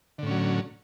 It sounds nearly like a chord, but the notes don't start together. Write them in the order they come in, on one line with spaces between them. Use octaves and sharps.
D3 A2 C#4 F#3